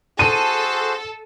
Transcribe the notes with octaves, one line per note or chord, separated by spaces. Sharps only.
F#4 G#4 A4 C5 D#7